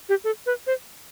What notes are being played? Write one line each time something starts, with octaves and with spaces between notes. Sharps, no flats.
G4
A4
B4
C5